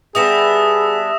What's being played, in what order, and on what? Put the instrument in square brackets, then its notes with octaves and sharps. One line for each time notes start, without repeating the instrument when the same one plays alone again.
[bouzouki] G3 B3 D4 [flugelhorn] G#4 [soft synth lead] E5 [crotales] D#6 A#6 E7